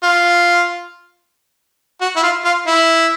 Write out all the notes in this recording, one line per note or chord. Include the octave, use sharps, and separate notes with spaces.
F4
F#4
E4
F4
F4
E4